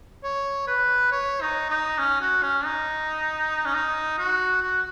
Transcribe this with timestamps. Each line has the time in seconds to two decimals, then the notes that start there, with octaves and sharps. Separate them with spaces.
0.24 C#5
0.68 B4
1.11 C#5
1.41 D#4
1.70 D#4
1.98 C#4
2.21 F#4
2.43 C#4
2.65 D#4
3.66 C#4
3.74 D#4
4.18 F#4
4.62 F#4